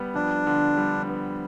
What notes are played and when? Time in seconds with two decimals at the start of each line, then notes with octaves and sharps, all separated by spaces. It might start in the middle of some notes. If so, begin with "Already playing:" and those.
Already playing: G3 B3
0.15 F2 D4
0.47 D3
0.77 G3
1.09 B3